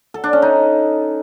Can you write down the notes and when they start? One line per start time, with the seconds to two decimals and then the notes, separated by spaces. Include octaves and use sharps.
0.14 A4
0.24 D4
0.33 C#4
0.42 D#4